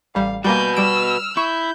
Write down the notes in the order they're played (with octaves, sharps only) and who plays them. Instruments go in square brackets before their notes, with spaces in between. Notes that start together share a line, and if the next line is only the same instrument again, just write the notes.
[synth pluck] A1 G3 [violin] F5
[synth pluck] G3 A#3 [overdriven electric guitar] F#4 B4 [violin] G#5 G6
[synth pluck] G3 D7 [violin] E6 F6
[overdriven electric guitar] E4 [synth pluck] C#6 [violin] G6